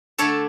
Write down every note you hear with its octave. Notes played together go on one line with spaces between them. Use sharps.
D3 A3 D4 A4 C#5